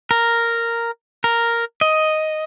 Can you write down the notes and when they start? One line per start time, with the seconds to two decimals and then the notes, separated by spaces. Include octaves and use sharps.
0.11 A#4
1.24 A#4
1.81 D#5